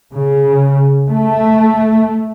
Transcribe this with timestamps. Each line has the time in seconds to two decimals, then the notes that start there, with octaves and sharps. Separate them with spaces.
0.12 C#3
1.09 A3